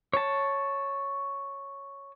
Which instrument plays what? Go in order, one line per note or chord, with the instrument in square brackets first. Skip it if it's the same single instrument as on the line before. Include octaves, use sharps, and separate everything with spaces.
[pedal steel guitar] C#5 A5